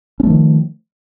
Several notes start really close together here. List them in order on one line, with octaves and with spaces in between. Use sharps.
C#4 A3 F3 D#3